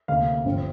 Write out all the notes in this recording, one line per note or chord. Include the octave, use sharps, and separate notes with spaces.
D2 C3 A#3 F5
G1 G2 F3 C4